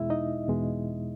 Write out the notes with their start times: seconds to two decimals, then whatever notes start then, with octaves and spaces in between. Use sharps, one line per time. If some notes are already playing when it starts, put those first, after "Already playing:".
Already playing: E2 B2 G#3 E4 E5
0.10 D#4 D#5
0.48 E2 B2 G#3